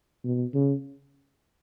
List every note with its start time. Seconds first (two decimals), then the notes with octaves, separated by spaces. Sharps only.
0.24 B2
0.54 C#3